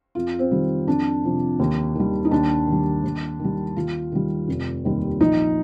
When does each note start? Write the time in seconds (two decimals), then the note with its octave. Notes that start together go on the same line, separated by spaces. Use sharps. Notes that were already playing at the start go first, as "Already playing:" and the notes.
0.15 F2 F4
0.39 C4
0.51 D#3 G3
0.87 F2 D4
1.24 C3 F3
1.59 D#2
1.95 D#3 G3
2.25 D#4
2.31 D#2 D4
2.67 D#3 G3
3.03 D#2
3.40 D#3 G3
3.76 D#2 F4
4.12 D#3 G3
4.48 F1
4.85 D#2 D#3 G3
5.21 A#1 D#4